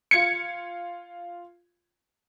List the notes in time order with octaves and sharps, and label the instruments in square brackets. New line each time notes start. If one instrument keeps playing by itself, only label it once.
[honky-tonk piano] F4 G#6 C#7